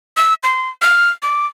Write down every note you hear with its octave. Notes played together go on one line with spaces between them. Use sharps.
E6
C6
F6
D6